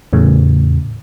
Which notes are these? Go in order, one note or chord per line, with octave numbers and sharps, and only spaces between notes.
E2 A2 C#3